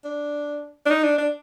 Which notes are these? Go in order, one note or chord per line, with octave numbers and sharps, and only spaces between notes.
D4
D4
D#4
D4
D4